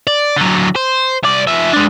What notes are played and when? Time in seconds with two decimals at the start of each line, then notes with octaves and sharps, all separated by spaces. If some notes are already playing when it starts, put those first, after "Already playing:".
0.07 D5
0.36 D3 F#3
0.76 C5
1.23 C2 D5
1.47 F3 E5
1.73 G#3 D4